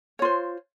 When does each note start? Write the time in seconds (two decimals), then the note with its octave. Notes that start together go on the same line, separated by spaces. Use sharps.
0.19 C#5
0.22 F4
0.25 C5